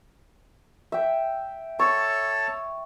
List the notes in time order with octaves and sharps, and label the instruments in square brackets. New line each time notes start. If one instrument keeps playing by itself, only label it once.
[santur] E5 G5
[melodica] A4 C#5 A5 [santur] C#6